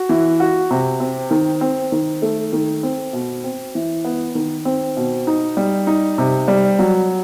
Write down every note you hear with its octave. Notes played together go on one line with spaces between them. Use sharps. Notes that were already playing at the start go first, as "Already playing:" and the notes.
Already playing: F#4
E3
F#4
C3
C4
D#3
C4
D#3
A3
D#3
C4
B2
C4
E3
B3
D#3
C4
B2
D#4
G3
D#4
C3
G3
F#3